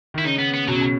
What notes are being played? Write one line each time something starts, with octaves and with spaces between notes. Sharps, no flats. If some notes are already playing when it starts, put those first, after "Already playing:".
D#3 E4
C#3 D#4
B3
B3
B2 F#3
C#3
B2